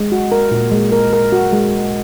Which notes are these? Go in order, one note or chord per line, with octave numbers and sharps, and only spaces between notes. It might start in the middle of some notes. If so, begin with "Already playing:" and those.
Already playing: G#3
F#4
A#4
A#2
G#3
A#4
A#4
F#4
G#3